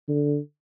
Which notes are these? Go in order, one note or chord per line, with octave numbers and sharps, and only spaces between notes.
D3